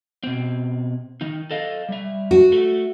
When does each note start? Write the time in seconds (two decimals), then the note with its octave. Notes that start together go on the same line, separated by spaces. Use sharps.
0.23 B2 C4
1.21 D#3 D#4
1.51 A4 D#5 F5
1.89 G3 E5
2.31 F#4
2.52 A3